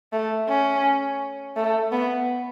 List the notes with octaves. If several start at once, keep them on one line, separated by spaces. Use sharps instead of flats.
A3
C#4
A3
B3